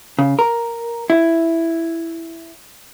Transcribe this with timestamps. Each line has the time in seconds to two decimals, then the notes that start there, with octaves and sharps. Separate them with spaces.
0.19 C#3
0.39 A#4
1.10 E4